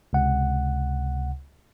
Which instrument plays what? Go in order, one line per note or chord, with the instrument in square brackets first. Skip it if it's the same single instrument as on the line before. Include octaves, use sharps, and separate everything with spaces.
[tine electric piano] C#2 C3 F#5